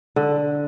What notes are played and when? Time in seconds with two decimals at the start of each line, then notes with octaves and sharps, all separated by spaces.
0.16 D3